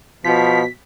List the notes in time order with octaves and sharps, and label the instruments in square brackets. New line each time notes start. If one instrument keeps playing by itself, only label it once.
[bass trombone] B2 [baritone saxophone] F3 [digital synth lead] B6